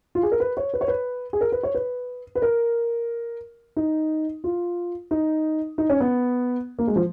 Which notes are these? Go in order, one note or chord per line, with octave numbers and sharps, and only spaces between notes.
F4
G#4
A#4
B4
C#5
B4
C#5
B4
G#4
A#4
B4
C#5
B4
B4
A#4
D#4
F4
D#4
D#4
C#4
B3
A#3
G#3
F3